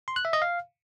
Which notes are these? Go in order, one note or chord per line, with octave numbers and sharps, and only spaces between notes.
C6
F#6
E5
D#5
F5